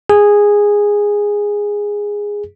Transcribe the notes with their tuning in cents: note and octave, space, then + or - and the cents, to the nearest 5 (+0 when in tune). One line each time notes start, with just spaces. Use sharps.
G#4 -10